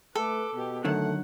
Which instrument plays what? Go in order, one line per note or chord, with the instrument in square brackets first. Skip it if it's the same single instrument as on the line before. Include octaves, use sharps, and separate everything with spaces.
[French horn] A3 [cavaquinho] A4 [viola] B4 D6
[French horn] B2 [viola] B3 G4
[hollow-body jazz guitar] F#2 D3 D#3 [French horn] A3 [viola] F#5